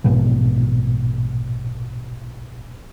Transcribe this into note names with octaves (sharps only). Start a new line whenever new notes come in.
A#1 G#2 B2 E3